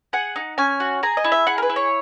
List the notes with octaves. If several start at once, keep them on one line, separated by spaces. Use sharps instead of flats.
G#4 F#5
D#4
C#4 G#5
F#4
G#4 A#5
D#5
E4
E5
G#4 F#5
A#4
B4
E4
C#5